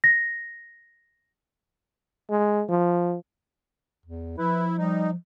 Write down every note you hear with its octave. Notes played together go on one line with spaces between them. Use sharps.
A#6
G#3
F3
E2
F3 E4 B4
G3 D#4